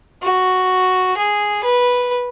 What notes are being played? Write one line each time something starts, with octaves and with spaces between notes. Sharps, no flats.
F#4
G#4
B4